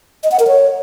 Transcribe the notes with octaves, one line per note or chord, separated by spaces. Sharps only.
D#5
F#5
A#4
C#5